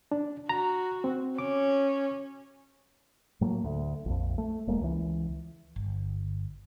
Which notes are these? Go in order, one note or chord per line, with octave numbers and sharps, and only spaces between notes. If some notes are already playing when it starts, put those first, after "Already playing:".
D4
F#4 A#5
C4
C#4 D6
A2 F#3 A#3
D2
A#1 F2
A3
E1 F#3 G#3 A#3
C#2 E3
G1